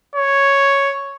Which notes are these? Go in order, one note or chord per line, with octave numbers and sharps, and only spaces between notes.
C#5